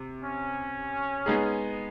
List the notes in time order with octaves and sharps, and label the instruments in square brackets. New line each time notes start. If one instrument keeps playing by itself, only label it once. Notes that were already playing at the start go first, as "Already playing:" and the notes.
Already playing: [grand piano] C3
[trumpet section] C#4
[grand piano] G#3 B3 D#4 G#4